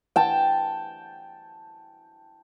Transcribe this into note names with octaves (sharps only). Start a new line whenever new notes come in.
G5 A5